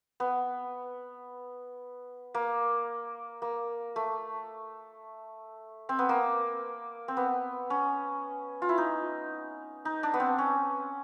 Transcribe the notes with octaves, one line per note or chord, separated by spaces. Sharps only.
B3
A#3
A#3
A3
C4
B3
A#3
C4
B3
C#4
F4
E4
D#4
D#4
D4
B3
C4
C#4